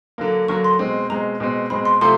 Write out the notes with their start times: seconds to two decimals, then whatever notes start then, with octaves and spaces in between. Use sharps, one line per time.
0.18 D3 F#3 A#3
0.48 D3 F#3 A#3 C#6
0.64 C6
0.79 B2 G#3 C4
1.10 B2 G#3 C4 A#5
1.40 B2 G#3 C4
1.70 B2 G#3 C4 B5
1.85 C6
2.01 C3 F3 A3 C6